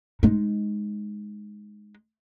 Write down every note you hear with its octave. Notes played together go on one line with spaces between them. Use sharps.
G#3 D#4